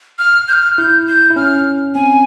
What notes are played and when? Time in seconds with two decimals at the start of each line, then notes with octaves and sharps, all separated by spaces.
0.19 F6
0.48 G6
0.53 F6
0.78 E4 G6
1.07 G6
1.30 E4
1.36 C#4 F6
1.95 C4 G#5